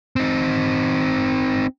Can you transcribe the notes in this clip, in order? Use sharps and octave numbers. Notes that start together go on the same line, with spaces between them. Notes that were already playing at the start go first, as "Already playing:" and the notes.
C4 D#4